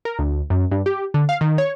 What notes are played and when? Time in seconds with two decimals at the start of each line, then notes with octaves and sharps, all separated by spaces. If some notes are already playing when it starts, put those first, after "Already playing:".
0.05 A#4
0.19 D2
0.50 F#2
0.71 G2
0.86 G4
1.14 D3
1.29 F5
1.41 D#3
1.58 C#5